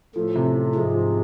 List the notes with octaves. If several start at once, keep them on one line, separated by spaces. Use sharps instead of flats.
A2 F3 A3
C3
F3
G#2 F3 G#3
F3